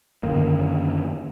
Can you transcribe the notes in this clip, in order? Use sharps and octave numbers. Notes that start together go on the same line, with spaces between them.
F#2 D3 D#3 A#3